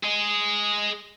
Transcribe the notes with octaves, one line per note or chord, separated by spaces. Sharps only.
G#4 D#5